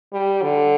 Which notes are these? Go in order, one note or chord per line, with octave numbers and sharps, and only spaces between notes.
G3
D3